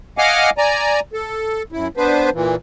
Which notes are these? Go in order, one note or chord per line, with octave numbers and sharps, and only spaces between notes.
D#5 F5 F#5 G#5 D6 F6
D5 G#5 A#5
A4
F#2 E4
B3 D4 B4 C5
A#2 E3